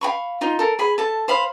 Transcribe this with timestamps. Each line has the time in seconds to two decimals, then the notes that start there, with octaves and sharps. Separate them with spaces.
0.01 F5 G5 B5 C#6
0.41 D#4 F4
0.59 A4 A#4
0.79 G#4 B5
0.98 A4 A5
1.28 C5 F5 B5